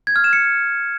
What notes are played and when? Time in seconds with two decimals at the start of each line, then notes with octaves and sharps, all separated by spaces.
0.07 G#6
0.16 F6
0.24 E7
0.33 C#7